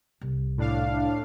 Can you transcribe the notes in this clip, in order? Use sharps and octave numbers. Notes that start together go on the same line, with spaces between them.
C2
A2 D4 F5